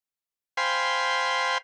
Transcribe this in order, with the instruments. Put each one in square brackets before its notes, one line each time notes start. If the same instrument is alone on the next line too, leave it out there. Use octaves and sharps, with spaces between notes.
[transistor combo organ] C5 F5 G5 G#5 B5 C6